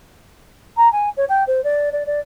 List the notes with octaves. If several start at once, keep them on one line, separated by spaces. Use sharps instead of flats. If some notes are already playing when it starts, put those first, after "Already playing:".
A#5
G#5
C#5
G5
C5
D5
D5
D5